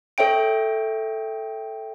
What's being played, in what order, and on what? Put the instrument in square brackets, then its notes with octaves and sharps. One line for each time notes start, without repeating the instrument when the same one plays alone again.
[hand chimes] A4 C#5 E5 G5 D7